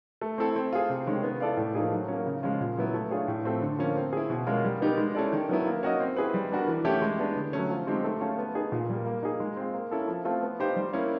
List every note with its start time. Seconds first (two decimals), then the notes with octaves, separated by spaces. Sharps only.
0.21 A3
0.38 C4 E4 A4
0.56 C4
0.73 F4 G#4
0.90 C3
1.07 D#3 G#3 C#4
1.23 B3
1.40 E4 A4 D5 F5
1.57 A2
1.75 F3 A#3 D#4 G#4
1.92 F#3
2.08 A#3 C#4
2.26 C#3
2.43 F3 G#3 C#4 F4
2.60 A#2
2.77 F#3 B3 E4
2.94 A3
3.11 D4 F4 G#4 C#5
3.28 A2
3.45 F3 A3 C4
3.61 D3
3.79 F3 A#3 C#4
3.96 C4
4.13 E4 G#4
4.30 B2
4.47 G#3 C#4 F4 A#4
4.64 G3
4.80 B3 D#4 G4 A#4
4.97 G#3
5.15 C#4 E4 A4 D5
5.32 D#3
5.49 F#3 B3 E4
5.66 A#3
5.83 C#4 F#4 A#4 D#5
6.00 C4
6.17 E4 G#4 B4
6.34 G3
6.51 B3 D4 F#4 A#4
6.67 E3
6.85 A3 C#4 E4 G4
7.02 G#3
7.19 B3 D4
7.36 D3
7.53 F#3 A3 C#4
7.70 F3
7.87 G#3 C4 D#4 G4
8.04 A3
8.21 C#4 F4 A4
8.38 B3
8.55 D#4 G#4
8.72 A#2
8.89 G3 A#3
9.06 A#3
9.23 D#4 G#4
9.40 G#3
9.57 C4 F4
9.74 A#3
9.91 C#4 E4 A4
10.08 F3
10.25 A3 C4 F4
10.42 B3
10.60 D#4 G4 C5 F5
10.76 G3
10.93 A#3 C#4 E4